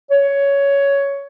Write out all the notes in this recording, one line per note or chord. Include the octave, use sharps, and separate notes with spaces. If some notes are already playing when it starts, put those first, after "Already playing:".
C#5